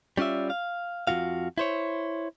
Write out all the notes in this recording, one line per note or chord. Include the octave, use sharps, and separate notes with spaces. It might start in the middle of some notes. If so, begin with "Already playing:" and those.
G3 C#4 F4 D5 E5
F5
F2 F#3 F4 F#4 F5
E4 C5 C#5